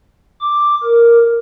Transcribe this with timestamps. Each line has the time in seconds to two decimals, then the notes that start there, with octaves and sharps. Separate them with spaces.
0.41 D6
0.83 A#4